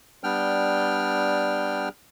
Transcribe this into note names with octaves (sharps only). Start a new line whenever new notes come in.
G3 B3 D4 G5 F6